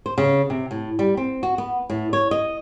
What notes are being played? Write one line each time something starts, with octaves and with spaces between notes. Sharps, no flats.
C5
C#3
C3
A2
G3
C4
F#4
B3
A2
C#5
D#5